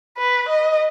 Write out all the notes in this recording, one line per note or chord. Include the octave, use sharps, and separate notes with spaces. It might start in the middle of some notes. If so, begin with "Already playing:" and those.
B4
D#5